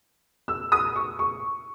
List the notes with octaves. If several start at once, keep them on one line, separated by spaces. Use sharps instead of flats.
E6
D#6
C#6
C#6